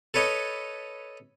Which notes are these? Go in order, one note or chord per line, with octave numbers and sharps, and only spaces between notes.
A4 B4 C#5 D#5